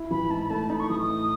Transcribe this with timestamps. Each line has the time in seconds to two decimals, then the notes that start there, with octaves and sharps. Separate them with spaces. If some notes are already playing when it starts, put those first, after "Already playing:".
Already playing: E4
0.10 E3 B5
0.30 G#2 A5
0.42 B5
0.50 A3 A5
0.70 D#4 B5
0.80 C#6
0.89 E3 D#6
1.00 D#6
1.10 A2